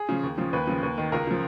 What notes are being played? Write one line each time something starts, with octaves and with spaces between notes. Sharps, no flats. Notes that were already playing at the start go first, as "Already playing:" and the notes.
Already playing: G#4
C#3 F3
D#2
C#3 F3
D#2 B4
C#3 F3
D#2
D#3
C#2 A#4
C#3 F3